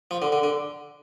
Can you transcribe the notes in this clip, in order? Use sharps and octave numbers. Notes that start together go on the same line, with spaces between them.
F3
D3
D3
D3